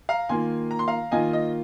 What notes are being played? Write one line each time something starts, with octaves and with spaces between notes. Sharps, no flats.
F5 A#5
D#3 A#3 F4 G#5 C6
A#5
C6
F5 A#5
D#3 A#3 F4 D#5 G#5
D#5